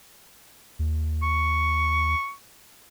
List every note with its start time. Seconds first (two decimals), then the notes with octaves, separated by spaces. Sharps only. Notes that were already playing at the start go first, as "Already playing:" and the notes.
0.79 D#2
1.23 C#6